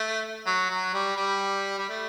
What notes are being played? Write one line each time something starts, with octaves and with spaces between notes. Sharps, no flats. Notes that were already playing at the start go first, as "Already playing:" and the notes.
Already playing: A3
F#3
F#3
G3
G3
G3
A3